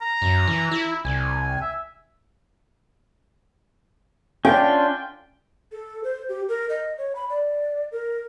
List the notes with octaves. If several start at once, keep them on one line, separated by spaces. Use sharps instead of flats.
A#5
F#2
E3
E4
C2 G#5
E5
C#4 D4 F4 G5
A4
C5
G4
A#4
D#5
C#5
B5
D5
A#4